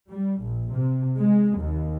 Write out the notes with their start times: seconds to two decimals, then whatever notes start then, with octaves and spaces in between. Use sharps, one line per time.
0.10 G3
0.41 A#1
0.73 C3
1.18 G#3
1.59 D#2